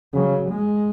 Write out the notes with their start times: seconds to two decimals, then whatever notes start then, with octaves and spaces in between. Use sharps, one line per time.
0.14 C#3 F#3
0.50 G#3